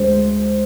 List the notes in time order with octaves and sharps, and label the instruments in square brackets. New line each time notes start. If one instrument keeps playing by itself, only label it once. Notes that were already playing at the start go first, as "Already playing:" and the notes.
Already playing: [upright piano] D2 G#3 C5